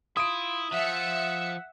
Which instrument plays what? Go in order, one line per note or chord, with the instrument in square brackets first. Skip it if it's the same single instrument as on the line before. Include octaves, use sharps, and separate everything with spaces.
[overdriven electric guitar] E4 [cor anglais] F4 [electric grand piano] D#6 D7
[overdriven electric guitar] F3 [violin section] E5 C#7 [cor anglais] F#5